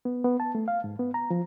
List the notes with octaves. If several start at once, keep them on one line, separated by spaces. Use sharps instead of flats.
B3
B3
A5
A3
F5
G#2
B3
A#5
F3